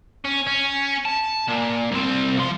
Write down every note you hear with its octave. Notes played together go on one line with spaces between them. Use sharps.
C#4
C#4
A5
A#2
C2 C4
F3 C6